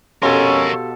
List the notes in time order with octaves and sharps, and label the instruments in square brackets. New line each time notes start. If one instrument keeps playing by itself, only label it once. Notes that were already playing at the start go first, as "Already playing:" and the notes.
[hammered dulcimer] B2 A4 [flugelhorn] C#4 [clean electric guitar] G4 F5 C6 [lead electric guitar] A#4 C#5